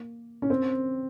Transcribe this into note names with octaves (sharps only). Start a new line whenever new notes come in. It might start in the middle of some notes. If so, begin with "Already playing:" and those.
Already playing: A#3
C#4
C4